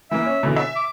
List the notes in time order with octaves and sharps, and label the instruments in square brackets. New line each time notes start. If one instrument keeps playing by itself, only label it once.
[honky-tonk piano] E3 A#3 [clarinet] E5
[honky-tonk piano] C#4
B2 D3 E3
E5
[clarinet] D6